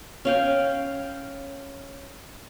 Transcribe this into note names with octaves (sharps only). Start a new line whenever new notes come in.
C#4 F5 G5